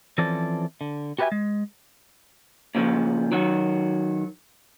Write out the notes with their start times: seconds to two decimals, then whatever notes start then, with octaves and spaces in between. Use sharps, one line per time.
0.18 E3 F3 C4 C#4 A4 D5
0.81 D3
1.19 F#4 G4 B4 C#5 E5 G#5
1.32 G#3
2.75 A#2 C#3 F3
3.32 D#3 F#3 F#4